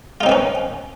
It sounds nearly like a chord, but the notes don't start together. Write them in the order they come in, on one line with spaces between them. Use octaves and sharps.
F4 D#4 C4 B4 C#4